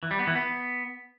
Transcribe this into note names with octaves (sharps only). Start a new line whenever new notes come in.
E3
G3
B3
E3
B3